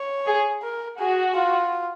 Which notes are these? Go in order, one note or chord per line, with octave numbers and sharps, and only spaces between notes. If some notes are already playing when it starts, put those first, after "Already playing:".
Already playing: C#5
G#4
A#4
F#4 G#4
F4